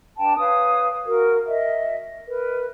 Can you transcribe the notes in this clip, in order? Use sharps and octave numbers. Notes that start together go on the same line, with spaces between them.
D4 B4 G5 A5
B4 C#5 F5 D#6
F#4 A#4
D#5 E5
A#4 B4